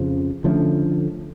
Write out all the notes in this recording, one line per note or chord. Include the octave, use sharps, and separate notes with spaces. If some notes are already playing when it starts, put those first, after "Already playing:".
Already playing: F2 C#3 F3
D3 F3 A3 C#4